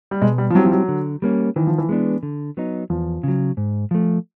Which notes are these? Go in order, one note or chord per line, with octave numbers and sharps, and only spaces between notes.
G3
B2 G#3
G3
F3
F#3 G3 C4 E4 G4
F3
F#3
D3
G3 A#3 C#4
D#3 E3
F3
E3
G#3 B3 D4
D3
F#3 B3 D#4
E2 F3
C#3 F#3
G#2
F3 A3